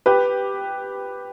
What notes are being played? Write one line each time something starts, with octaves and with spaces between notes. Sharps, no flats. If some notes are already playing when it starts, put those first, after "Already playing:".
G4 B4